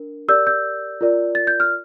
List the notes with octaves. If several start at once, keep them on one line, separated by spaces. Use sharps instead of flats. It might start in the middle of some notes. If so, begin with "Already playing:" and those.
Already playing: D4 A#4
G4 A#4 D5 E6 G6
E6 G6
F4 A#4 D5
A6
G6
F6